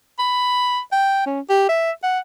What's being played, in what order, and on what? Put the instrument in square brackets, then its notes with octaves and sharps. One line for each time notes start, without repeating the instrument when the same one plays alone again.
[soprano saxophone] B5
G5
C#4
G4
E5
F#5